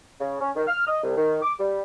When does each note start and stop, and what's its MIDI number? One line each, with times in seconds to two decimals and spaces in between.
0.20 0.37 49
0.41 0.50 61
0.55 0.66 51
0.67 0.82 89
0.87 1.03 75
1.03 1.16 36
1.16 1.38 51
1.42 1.53 86
1.59 1.80 55